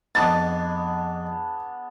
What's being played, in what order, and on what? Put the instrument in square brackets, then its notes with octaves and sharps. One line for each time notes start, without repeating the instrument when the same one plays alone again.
[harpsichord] F2 D#4 [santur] B3 D4 G#4 [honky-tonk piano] A6